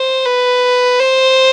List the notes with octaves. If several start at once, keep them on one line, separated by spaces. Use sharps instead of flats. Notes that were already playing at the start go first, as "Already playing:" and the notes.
Already playing: C5
B4
C5